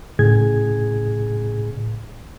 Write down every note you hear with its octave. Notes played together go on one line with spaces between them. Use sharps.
A2 C#3 G#4 G#6